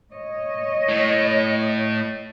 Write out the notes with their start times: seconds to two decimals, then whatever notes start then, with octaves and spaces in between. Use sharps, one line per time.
0.12 C#5 D#5
0.88 A2